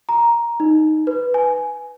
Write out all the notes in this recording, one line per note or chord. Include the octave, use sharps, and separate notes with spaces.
A#5
D#4
B4
G#5